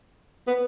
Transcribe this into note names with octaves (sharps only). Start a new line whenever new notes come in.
B3